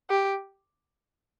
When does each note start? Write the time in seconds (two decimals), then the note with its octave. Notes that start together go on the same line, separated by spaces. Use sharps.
0.10 G4